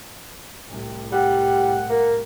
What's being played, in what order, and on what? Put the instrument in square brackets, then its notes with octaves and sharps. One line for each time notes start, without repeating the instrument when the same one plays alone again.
[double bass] C2 A2
[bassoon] G3 [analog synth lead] F#5
[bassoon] A#3